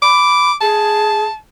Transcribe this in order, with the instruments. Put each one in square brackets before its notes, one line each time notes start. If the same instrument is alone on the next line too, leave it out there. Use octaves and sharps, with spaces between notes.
[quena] B5 [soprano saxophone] D6
[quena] G#4 [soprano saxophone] A5